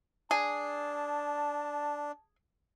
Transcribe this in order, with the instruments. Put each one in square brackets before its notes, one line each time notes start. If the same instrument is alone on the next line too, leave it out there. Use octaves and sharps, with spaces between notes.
[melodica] D4 [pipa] G#4 [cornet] A5